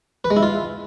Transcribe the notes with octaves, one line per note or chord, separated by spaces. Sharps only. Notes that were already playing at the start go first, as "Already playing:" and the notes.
B4
G#3
E4
F4